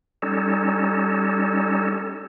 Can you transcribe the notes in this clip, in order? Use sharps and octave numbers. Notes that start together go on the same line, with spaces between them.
G3 C#4 D#4 A4